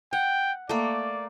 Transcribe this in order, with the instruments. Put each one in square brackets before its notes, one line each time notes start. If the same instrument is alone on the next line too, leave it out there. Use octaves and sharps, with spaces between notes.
[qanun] F#5 [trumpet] G5
[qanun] A3 A#3 [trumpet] D5